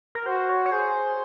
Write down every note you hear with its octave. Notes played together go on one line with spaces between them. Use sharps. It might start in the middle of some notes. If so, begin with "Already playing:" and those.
A#4
F#4 C5
C#5
C#5
G#4 C5